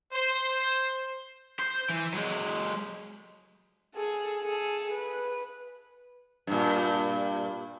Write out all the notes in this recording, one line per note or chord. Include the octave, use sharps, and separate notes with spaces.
C5
C5
E3
F#3 G#3
G#4 A4
G#4 A4
B4
G2 A#2